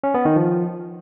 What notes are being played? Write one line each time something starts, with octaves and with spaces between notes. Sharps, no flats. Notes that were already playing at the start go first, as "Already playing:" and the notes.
C#4
B3
D#3
F3